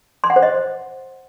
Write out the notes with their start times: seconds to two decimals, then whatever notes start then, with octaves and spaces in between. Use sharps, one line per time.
0.24 C6
0.30 F#5
0.36 C5
0.42 D#5